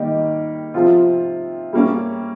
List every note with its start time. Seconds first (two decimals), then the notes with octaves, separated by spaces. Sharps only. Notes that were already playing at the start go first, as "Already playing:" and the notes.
Already playing: D#3 G3 A#3 D#4 G4
0.74 C3 F3 C4 F4
1.73 G3 A#3 C#4